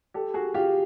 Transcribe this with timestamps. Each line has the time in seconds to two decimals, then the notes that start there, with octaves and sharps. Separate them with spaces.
0.14 G4 A4
0.34 F#4 G#4
0.54 F4 G4